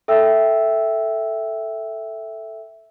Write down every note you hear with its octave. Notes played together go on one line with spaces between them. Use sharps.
A4 E5 G5 E6